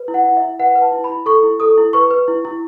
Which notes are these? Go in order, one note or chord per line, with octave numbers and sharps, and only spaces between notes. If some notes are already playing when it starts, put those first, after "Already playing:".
Already playing: B4
E4
F#5
E4
E4 E5
B4 F#5
B4
A5
E4
B5
E4
A4 C#6
E4
A4 D#6
E4
B4 C#6
B4
E4
E4